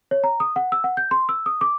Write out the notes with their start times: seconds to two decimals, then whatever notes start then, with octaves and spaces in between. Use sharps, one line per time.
0.11 C#5
0.24 A#5
0.40 D#6
0.56 F#5
0.72 E6
0.84 F#5
0.97 G6
1.11 C6
1.29 E6
1.46 D#6
1.61 D6